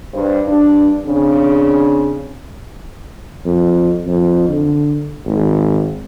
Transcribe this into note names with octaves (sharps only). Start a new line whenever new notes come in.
G2 C5
G2 D4
C#3 C4 D4
F2
F2
D3
G#1